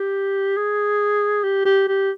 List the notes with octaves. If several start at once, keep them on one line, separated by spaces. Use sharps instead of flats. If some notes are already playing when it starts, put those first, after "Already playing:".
Already playing: G4
G#4
G4
G4
G4